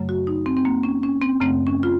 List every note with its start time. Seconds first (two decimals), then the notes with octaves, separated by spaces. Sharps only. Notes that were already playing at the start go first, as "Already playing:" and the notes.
Already playing: F#2 C#3 F#3 A3
0.09 F#4
0.27 D#4
0.46 C4
0.57 C4
0.65 A#3
0.83 C#4
1.03 C#4
1.22 C4
1.40 F#2 C#3 A3 C4
1.67 C#4
1.83 F4